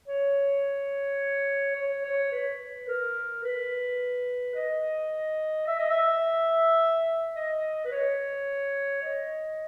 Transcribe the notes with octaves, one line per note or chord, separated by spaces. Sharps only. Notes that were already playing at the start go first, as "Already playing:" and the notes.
C#5
C#5
C#5
B4
A#4
B4
D#5
E5
D#5
E5
D#5
B4
C#5
D#5